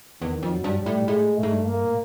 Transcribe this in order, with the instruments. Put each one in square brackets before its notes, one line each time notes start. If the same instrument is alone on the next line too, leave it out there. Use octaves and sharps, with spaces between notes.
[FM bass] E2 [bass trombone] D#3
[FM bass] F2
[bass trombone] F#3
[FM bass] G2
[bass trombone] G3
[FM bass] A2
[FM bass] A2 [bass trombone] G#3
[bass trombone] A3
[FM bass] G#2
G2
[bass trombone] A#3
[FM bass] A2